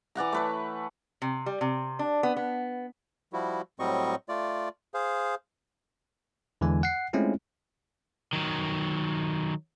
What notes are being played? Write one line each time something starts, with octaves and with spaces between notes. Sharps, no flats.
E3 D5 F#5 A#5
A3 B4 C#5
C3
G3
C3
D4
B3
B3
F3 G3 E4 F#4
A2 F#3 G3 C4 D#5 C#6
A3 F4 D5
G#4 C5 F5
E2 D3 E3 G#3 G#5
F#5 C7
G#3 A3 C4 C#4 E4 F4
D#3 F#3